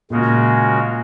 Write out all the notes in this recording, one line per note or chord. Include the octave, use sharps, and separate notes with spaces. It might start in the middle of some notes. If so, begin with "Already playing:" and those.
A#2 C#3 G#3 C#4 F#4 A#4